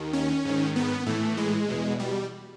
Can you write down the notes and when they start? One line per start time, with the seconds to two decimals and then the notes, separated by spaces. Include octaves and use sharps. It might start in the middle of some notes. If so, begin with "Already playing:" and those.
Already playing: D#2 D#3
0.13 C#4
0.45 G#2 D#3
0.76 B3
1.06 A2 E3 A3
1.37 G#3
1.68 E2 B2
2.00 G3